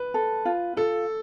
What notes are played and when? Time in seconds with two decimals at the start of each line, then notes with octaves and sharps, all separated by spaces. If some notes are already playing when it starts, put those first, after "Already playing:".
Already playing: B4
0.14 A4
0.45 F4
0.77 F4 A4